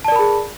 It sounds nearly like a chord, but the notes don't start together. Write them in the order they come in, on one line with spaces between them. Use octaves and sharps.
A5 D5 A#4 B5 G#4